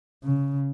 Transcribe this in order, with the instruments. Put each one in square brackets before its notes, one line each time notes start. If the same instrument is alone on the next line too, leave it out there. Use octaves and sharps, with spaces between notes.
[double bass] C#3